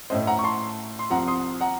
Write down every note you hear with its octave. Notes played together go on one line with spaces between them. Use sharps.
A2 A3 C#4 C5 D#5
F#5 A#5
C#6
A5 C6
C6
C2 C3 F3 F#5 A#5
C6 D#6
F#5 A#5